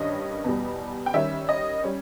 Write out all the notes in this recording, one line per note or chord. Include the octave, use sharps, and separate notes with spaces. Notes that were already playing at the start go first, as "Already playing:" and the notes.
Already playing: G2 D#3 G3 C#4 D#5
E2 B2 G3
G5
D#3 G3 C#4 E5
D#5
G3 C#4